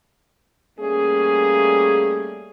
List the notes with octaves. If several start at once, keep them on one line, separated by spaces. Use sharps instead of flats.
G3 A3 A#3 C#4 G#4